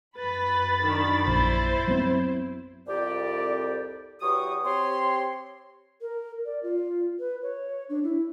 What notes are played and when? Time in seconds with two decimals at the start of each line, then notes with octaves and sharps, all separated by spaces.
0.18 F#2 B4 B5 A6
0.83 D#3 D4
1.27 A#1 E4 C5
1.88 F#3 B3 C4
2.87 C2 F2 G4 D5
4.20 E2 F#3 G4 C#6 D#6
4.64 C4 G4 C#5 C6
6.01 A#4
6.45 D5
6.63 F4
7.19 B4
7.42 C#5
7.89 D4
8.03 E4